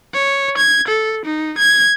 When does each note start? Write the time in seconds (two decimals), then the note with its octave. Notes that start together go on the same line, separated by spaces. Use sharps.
0.14 C#5
0.57 G#6
0.88 A4
1.25 D#4
1.58 G#6